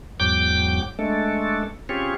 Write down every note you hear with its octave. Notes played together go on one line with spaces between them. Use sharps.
E2 G#2 F#3 G5 D6 G6
G#3 A3 D4 A4
C4 C#4 F4 G4 G#4 C#5